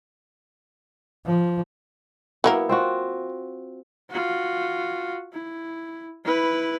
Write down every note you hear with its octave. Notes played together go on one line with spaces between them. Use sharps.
F3
F#3 A#3 B3 E4 A#4
C4 F4 F#4
F4 F#4
E4
E4 B4